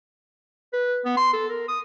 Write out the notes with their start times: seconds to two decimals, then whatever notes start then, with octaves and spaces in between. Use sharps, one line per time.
0.73 B4
1.05 B3
1.17 C6
1.33 A4
1.49 A#4
1.68 D#6